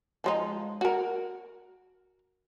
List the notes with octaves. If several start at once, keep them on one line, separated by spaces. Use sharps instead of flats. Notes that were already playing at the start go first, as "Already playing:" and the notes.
F3 G#3 D#4
F#4 A#4